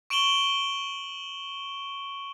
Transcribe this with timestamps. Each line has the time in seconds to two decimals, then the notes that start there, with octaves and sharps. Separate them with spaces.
0.10 C#6 D7 E7 F#7 G7